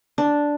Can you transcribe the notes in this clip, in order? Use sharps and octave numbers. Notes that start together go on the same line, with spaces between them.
D4